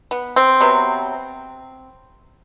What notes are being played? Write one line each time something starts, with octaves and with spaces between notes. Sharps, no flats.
B3
C4
C3 F#3 B3